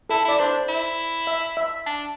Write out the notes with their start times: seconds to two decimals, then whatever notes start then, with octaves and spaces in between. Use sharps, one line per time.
0.09 E4 A4
0.25 E4 D5
0.39 D4 C5
0.69 E4
1.27 E5
1.57 E5
1.86 D4